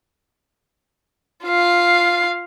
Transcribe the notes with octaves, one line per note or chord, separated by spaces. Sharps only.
F4 F5